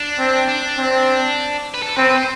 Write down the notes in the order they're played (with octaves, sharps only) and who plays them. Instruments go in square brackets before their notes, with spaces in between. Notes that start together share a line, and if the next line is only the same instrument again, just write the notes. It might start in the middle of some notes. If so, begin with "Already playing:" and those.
Already playing: [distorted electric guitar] D4
[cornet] C4
[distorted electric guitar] D4
[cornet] C4
[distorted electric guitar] B4
A4
[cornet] C4 [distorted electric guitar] B4
[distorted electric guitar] B4
C5